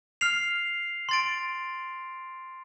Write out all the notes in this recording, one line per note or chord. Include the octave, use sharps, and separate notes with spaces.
F6 C7 F7
C6 A6 D7